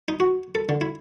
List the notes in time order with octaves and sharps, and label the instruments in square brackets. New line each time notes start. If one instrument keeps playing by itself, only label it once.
[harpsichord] D#4
F#4
A4
D3
E4